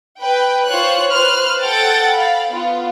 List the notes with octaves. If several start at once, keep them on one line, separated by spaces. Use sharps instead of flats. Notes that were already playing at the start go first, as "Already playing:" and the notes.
B4 G5
F4 C5 C#5 F#6
B4 C5 F6 F#6
A4 F#5 G5 A6
F5 B5
B3 F4